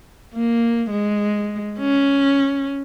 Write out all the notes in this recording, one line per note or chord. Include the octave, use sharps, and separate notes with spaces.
A#3
G#3
C#4